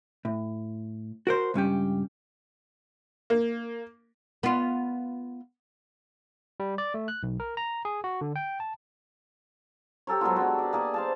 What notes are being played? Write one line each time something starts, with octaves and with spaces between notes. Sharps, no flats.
A2
F#4 A#4 C5
C#2 G2 C#4 G4
A#3
B3 F4
G3
D5
A3
F#6
B1
A#4
A#5
G#4
F#4
D3
G5
A5
G4 A4 A#4 C#5
F#3 G#3 B3 F4
F#3 D4
G4 D5
A#3 G#4 D5
C5 F5 A5